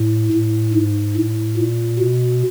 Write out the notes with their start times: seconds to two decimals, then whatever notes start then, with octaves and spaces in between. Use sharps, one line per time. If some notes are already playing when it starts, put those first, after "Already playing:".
Already playing: A2
0.33 A2
0.74 G#2
1.17 A2
1.57 A#2
1.99 B2